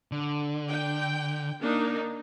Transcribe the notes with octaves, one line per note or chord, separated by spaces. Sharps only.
D3
G5
A#3 D4 D#4